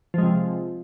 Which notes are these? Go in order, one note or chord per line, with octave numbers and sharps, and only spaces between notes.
C3 F3 G#3